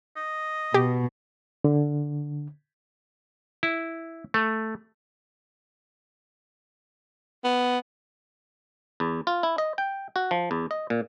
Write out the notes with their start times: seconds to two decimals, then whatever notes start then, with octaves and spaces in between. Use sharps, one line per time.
0.16 D#5
0.74 B2 G4
1.64 D3
3.63 E4
4.34 A3
7.44 B3
9.00 E2
9.27 F4
9.43 E4
9.58 D#5
9.78 G5
10.16 F#4
10.31 F3
10.51 E2
10.71 D#5
10.90 A#2